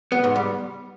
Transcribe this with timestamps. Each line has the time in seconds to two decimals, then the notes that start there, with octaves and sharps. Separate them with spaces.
0.12 B3
0.24 G#2
0.36 G3